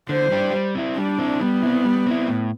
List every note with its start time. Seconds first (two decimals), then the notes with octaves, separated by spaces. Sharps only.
0.09 D3 C5
0.31 G3 D4 G4
0.53 G3
0.75 C4 E4
0.98 G3 D4
1.19 C4 E4
1.40 G3 B3
1.63 C4 E4
1.85 G3
2.06 C4 E4
2.28 A2